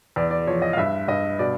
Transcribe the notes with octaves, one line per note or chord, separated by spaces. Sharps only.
E2 D5
D5
F3 C#5
D#5
F5
G2 E5
G2 D#5
B2 D5